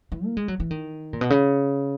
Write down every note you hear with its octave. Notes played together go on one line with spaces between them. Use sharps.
E3
A#3
G#3
F#3
E3
D#3
A#2
B2
C#3